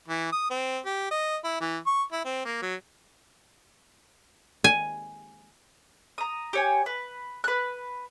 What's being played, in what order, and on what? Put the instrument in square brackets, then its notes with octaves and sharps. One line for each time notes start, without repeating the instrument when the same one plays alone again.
[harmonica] E3
D#6
C4
G4
D#5
E4
E3
C#6
E4
C4
A#3
F#3
[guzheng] G#5
[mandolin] A#5 D#6
G4 C#5 G#5
B4
B4 F#6